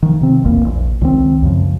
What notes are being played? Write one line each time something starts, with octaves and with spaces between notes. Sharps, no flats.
D#3 F3
C3 C4
E1 A#1 E2 A#3
A#1
C#2 D#3 E3 C4
C#2 F#2 C#3 F3